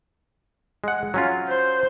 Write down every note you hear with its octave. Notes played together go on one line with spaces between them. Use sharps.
G#3 F#5
F#3 C#4 F4
C5